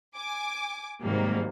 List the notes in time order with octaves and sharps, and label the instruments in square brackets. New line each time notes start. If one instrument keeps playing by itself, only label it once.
[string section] G#5 D6
G#2 C3 D#3 F#3 G3 A#3